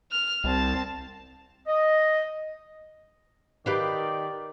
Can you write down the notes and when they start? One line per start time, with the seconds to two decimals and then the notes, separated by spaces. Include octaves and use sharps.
0.12 F6
0.44 C2 C4 A5
1.66 D#5
3.66 D#3 G4 B4 D5 F5